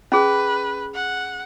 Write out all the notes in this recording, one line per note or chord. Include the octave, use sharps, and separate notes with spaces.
C#4 G#4 B4
F#5